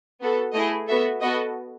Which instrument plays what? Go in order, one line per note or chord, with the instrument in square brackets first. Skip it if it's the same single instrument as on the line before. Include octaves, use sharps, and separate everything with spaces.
[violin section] B3 F#4 A4
A3 E4 G#4 D#5
B3 F#4 A4 E5
B3 F#4 A4 D#5